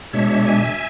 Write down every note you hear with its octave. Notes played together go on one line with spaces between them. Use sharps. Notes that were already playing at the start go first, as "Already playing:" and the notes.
B2 G#3 D4 C#5 E5
E5 G#5